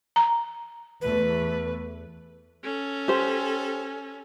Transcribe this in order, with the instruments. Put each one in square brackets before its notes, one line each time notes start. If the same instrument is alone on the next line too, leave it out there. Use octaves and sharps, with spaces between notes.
[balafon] A#5
[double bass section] E2 A3 [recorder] B4
[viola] C#4 A4
[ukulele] G4 C5